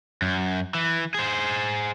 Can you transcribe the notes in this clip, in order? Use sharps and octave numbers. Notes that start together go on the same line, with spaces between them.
F#2
E3
G#4 C5